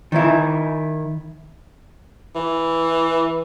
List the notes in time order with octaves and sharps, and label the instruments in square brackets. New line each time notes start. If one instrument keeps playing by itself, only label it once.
[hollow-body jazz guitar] D#3 E4
[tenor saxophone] E3